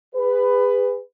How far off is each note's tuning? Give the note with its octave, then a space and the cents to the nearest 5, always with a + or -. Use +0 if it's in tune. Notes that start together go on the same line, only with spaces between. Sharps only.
G#4 -35 B4 +15